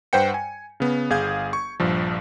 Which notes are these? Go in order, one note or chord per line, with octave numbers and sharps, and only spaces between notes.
G2 B4 C5 F#5 G5 C#7
G#5
C#3 B3
G1 G#4 F5 G6 G#6
C#6
A#1 G2 F3